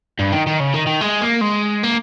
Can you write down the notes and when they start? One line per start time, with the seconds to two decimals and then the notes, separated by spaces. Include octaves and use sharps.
0.19 G2
0.32 D#3
0.47 D#3
0.60 C#3
0.74 D#3
0.87 D#3
1.01 G#3
1.22 A#3
1.41 G#3
1.84 A#3